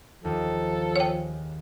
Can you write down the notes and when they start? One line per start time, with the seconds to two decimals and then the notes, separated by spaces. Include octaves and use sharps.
0.24 D#2 F3 A4
0.96 G#4 C#5 G5